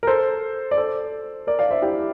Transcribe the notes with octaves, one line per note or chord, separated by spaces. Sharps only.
A#4
A4 C5
D5
A4 C5
A#4 D5
D5 F5
C5 E5
E4 G4